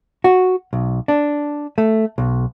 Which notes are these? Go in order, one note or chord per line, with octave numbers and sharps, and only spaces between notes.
F#4
B1
D4
A3
B1